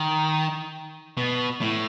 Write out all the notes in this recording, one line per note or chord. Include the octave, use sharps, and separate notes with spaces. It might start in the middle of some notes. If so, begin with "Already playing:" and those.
Already playing: D#3
B2
A2